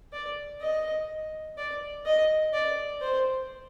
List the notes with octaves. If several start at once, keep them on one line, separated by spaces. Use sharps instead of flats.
D5
D#5
D5
D#5
D5
C5